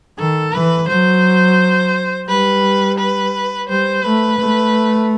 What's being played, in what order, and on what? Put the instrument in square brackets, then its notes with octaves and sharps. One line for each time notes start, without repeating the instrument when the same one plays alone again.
[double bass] D#3 [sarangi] A4
[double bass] E3 [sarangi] B4
[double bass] F#3 [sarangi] C5
[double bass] G3 [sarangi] B4
[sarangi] B4
[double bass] G3 [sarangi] C5
[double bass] A3 [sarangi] B4
[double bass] A3